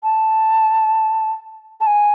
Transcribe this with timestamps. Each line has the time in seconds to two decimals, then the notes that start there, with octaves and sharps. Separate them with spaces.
0.04 A5
1.81 A5
1.87 G#5